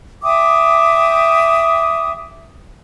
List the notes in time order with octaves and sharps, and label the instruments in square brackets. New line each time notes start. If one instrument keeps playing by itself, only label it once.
[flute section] E5 G5 D6 D#6